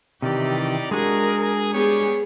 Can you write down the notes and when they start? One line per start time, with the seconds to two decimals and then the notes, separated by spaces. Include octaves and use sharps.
0.22 C3 D#3 E3 D#4 G4 D5
0.91 G#3 D4 F#4 G#4 A#4
1.72 G3 B3 G4 G#4 C#5